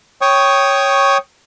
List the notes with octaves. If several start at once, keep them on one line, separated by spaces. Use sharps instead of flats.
C#5 G5 C#6 D#6